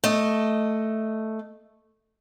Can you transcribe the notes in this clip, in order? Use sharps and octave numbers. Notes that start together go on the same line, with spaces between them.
A3 D#5